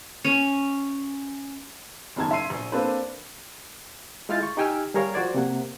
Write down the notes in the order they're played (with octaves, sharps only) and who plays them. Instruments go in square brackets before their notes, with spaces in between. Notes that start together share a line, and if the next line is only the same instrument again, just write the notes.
[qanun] C#4
[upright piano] F#1 F#2 D#3 A5 G#6
E5 C6 C7 D#7
A#1
A#3 C4 D4 A4 B4 C5
[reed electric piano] G#3 E4 F4 F6 G6 A6
C#6
D#4 G4 G5 G#5 E6 F6
G3 G#4 A#4 C#5 F5
F3 F#4 C5 D5 G#6
C3 A#3 F#5